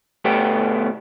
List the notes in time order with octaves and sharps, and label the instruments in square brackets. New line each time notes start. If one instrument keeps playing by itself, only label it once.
[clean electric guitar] B2 A3 B3 G4